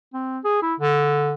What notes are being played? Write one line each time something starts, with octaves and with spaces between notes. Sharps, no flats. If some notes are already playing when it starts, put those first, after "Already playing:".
C4
G#4
E4
D3